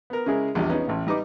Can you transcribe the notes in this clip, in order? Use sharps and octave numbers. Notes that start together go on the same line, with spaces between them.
B3 A#4
C#3 G#3 E4 G#4 A#4
A#1 E2 G3
B3 C#4 D#4
A1 A2
G3 D#4 B4 D6